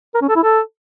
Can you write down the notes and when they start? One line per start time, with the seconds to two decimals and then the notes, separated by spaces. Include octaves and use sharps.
0.14 A#4
0.22 C#4
0.29 A4
0.36 E4
0.43 A4